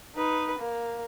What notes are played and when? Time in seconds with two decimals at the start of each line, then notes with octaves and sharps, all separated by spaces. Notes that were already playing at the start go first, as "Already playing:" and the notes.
0.15 D#4 B4
0.58 A#3